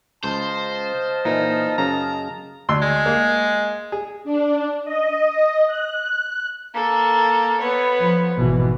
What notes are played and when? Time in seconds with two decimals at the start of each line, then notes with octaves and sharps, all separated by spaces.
0.24 C#2 C5 D#5 F5 A5
1.25 A#2 E3 D#4
1.78 F#2 C#3 A#5
2.69 D2 C6 E6
2.82 G#3
3.06 A#3
3.92 G#4
4.24 D4
4.85 D#5
5.67 F#6
6.74 A#3 A4
7.60 B3 C#5
7.99 F3
8.37 G#1 B2 E3